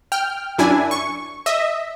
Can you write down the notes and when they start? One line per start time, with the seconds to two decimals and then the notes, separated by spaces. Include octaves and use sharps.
0.12 G5 F6
0.58 F#2 D4 E4 G#5
0.91 C#6
1.46 D#5 E5